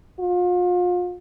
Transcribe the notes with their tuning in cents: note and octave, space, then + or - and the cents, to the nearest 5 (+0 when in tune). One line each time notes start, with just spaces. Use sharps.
F4 +35